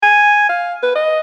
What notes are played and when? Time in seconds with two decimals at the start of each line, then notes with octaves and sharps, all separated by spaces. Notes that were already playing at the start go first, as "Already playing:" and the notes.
0.03 G#5
0.49 F5
0.83 B4
0.95 D#5